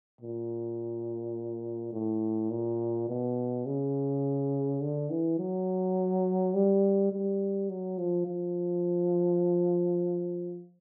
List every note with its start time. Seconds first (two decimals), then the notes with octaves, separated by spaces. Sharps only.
0.21 A#2
1.93 A2
2.50 A#2
3.09 B2
3.66 C#3
4.81 D3
5.10 E3
5.38 F#3
6.54 G3
7.12 G3
7.69 F#3
7.98 F3
8.26 F3